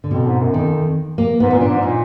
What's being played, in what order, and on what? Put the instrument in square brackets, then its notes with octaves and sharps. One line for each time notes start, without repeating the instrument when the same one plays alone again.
[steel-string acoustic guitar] D3
[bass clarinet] F2 [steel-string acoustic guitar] B2
[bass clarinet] G#2
F#2
[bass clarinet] F2 [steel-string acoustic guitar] D#3
[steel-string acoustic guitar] A#3
[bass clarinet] G#2 [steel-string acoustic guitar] B3
[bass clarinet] A#2 [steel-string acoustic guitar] B3
[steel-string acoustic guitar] D4
[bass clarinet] G#2
[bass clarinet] A#2 [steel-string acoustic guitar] D#4